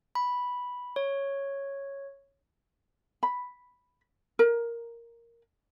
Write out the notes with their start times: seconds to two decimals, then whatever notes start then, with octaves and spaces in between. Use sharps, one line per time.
0.15 B5
0.96 C#5
3.23 B5
4.39 A#4